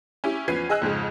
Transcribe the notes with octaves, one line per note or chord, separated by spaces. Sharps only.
C#4 E4 G4
E2 F3 C#4 B4 G#6 C7
G#4 D#5 G#5 E6 F#6
F2 G#2 C#3 G#3